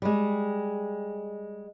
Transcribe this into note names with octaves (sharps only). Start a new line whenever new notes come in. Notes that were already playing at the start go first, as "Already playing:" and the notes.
G3 G#3